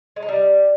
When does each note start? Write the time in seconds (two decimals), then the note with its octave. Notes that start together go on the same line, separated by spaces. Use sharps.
0.16 G#3
0.22 D#4
0.29 G3